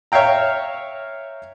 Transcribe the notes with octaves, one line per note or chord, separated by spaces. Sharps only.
C#5 E5 F5 G5 A#5